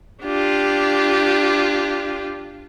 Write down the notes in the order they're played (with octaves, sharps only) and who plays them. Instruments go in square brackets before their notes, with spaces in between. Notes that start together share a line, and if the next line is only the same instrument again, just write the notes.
[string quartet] D4 F4 G4